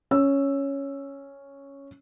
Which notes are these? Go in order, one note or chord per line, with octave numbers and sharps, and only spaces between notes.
C#4 E6